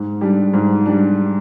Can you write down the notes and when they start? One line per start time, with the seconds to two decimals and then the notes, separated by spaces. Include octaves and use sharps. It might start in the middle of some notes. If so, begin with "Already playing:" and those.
Already playing: G#2
0.21 G3 D4
0.53 G#2
0.86 G3 D4